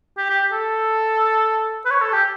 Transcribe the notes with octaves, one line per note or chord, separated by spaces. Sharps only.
G4
G4
A4
B4
C#5
A4
G4